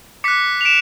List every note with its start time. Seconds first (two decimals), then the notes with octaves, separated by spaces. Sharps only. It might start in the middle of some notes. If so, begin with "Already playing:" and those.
0.24 D6 F#6 B6 C#7
0.61 F7
0.65 D7 E7